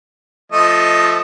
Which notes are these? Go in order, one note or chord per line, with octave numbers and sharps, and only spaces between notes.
F3 A3 D#5